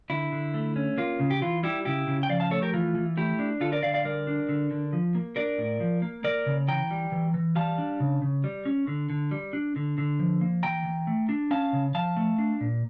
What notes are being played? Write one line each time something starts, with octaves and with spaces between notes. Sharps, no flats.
D3 E4
D3
A3
C#4
A#3 F4
C#3
G4
E3 F4
G3 E4 G4
C#3 E4 G4
C#3
G5
F3 D5 F5
F5 A5
A3 A4 C#5
G4 A#4
E3 F4
E3
A3 E4 G4
D4
D3 F4 A4
A#4 D5
D3 D5 F5
D5 F5
G3 A#4 D5
D4
D3
D3
F3
A#3
D4 A#4 D5
A2
F3
A#3
A#3 A#4 D5
C#3
E3 G5 A#5
G3
E3
E3
G3 F5 A5
D4
C#3
C#3
G3
C#4
D3
D3
G3
D4
D3
D3
F3
A#3
E3 G5 A#5
E3
A3
D4
C#4 F5 A5
C#3
F3 F5 A5
A3
D4
A#2